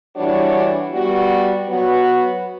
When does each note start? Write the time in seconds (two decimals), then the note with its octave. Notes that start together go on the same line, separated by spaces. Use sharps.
0.15 E3 G3 D4 F#4 C#5
0.91 G3 B3 F#4
1.67 F#3 B3 F#4 B4